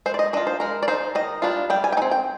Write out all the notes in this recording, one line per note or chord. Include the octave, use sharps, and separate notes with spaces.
G#3 C5
D5
D#5
D4 F4 D#5
C5
G#3 A#4
D5
D#4 C5
D#3 D#5
G3 D4 F4
G3 G5
G#5
G5
C4 D#4 G#5
G5